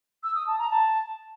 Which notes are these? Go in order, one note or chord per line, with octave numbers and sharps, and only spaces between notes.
E6
D#6
A5
A#5
A5